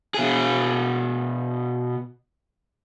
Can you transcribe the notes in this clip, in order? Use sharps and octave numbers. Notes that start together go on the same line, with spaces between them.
B2 G#4